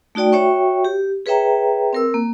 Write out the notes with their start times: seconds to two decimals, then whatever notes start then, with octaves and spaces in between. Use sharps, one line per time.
0.15 A3 D#4 F#4 D5 G5
0.32 F#4 C#5 E5 G5 C#6
0.85 G4
1.26 G#4 B4 C#5 E5 G5 A#5
1.93 C4 A#4 E6
2.14 A#3